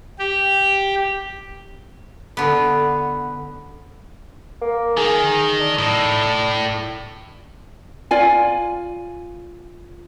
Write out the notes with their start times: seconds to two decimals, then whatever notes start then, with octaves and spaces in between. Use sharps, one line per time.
0.19 G4
2.37 D3 B3
4.62 A#3
4.97 D#3 G#4
5.60 D4
5.79 A2
8.11 F4 D5 G#5